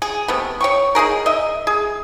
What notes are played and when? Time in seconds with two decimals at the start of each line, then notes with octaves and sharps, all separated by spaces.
0.02 G#4
0.28 C3 A3 B3
0.61 C#5 G5 C#6
0.95 D#4 G4 G#4 A#4
1.26 D#5 E5
1.67 G#4